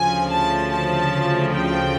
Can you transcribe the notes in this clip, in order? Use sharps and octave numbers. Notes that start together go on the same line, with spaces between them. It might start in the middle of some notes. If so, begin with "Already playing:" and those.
Already playing: D2 C#3 F3 G#5
A5
A5
G5